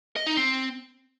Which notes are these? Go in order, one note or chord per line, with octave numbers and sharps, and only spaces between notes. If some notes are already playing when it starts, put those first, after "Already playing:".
D#5
D#4
C4